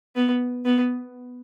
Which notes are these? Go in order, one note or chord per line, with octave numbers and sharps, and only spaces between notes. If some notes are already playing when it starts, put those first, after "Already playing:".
B3
B3